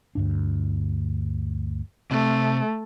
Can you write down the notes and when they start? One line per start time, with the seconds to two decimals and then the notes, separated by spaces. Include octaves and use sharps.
0.15 D2 G2 D4
2.11 C3 A3